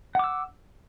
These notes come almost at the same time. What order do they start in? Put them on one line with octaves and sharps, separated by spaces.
F#5 D6 E6